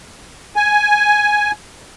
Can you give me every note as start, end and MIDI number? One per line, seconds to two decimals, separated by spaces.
0.56 1.51 80